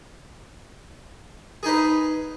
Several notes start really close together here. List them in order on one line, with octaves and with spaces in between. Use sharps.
G#4 D#4 B4